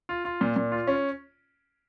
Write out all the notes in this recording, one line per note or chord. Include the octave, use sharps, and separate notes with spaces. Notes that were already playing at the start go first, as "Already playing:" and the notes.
F4
F4
A#2
A#2
F4
C#4